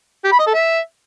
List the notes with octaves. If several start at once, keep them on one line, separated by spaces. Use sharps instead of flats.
G4
B5
D#5
A4
E5